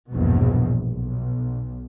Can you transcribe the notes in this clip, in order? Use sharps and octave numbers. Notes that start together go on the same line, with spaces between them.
A#1 E2 G2 B2
B1